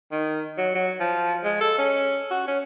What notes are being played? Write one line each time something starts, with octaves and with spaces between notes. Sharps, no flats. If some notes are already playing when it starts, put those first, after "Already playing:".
D#3
F#3
F#3
F3
G#3
A4
C#4
F#4
C#4